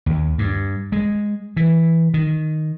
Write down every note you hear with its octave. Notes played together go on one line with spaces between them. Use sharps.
D#2
G2
G#3
E3
D#3